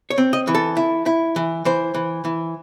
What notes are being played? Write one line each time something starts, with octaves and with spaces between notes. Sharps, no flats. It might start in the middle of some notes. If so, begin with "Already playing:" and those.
C#5
C4
D#5
E3
A4
E4
E4
E3
E3 C5
E3
E3